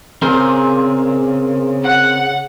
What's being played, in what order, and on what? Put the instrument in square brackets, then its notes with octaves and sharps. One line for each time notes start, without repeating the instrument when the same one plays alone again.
[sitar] A#2 G#4 [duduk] C#3 [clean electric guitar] C4 A#4 C5
[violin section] F#5